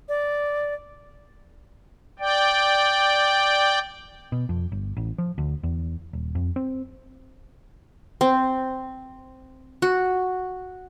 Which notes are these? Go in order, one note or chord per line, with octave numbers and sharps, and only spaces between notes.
D5
D5 G5
B2
F2
G1
A1
F3
D2
E2
D#1
F2
C4
C4
F#4